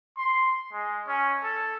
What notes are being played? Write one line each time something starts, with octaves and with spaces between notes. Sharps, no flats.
C6
G#3
C#4
A4